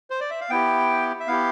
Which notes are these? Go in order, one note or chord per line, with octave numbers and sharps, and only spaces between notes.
C5
D5
E5
F5
B3 E4 G4 G5
E5
B3 E4 G4 F5